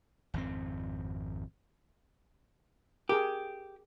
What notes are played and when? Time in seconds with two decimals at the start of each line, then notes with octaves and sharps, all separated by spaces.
0.34 G#1 F2 D#3 C4
3.09 G4 G#4 A#4